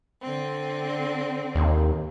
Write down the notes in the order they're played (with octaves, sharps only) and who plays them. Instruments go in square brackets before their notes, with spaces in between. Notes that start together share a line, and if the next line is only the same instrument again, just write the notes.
[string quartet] D3 C4
[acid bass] D#2